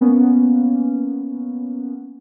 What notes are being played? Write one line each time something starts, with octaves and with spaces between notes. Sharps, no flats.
A#3 B3 C#4